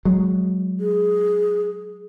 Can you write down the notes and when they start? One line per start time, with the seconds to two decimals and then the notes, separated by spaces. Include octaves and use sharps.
0.05 F#3 G#3
0.80 G#4